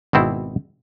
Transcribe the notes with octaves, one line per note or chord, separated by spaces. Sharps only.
G#1 B2 C4 E4